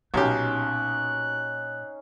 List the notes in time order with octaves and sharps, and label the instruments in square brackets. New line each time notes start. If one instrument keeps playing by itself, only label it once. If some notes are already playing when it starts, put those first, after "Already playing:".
[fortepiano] B1 G4 [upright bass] A#2 [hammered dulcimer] C#4 D#4 F5 [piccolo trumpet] F#6